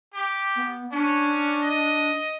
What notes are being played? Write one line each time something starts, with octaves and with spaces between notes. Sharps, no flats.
G4
B3
C#4 D4
D#5